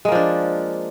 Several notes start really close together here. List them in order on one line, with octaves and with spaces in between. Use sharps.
G#3 A#3 F3 D4